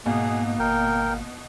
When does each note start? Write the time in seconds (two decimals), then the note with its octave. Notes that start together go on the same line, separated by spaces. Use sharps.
0.06 G#2 B2 A#3 G#4
0.59 G#1 A#4 G5